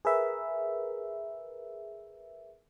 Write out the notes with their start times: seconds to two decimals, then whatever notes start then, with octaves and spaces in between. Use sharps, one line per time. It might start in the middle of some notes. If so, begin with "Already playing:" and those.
0.05 G#4 A#4 B4 E5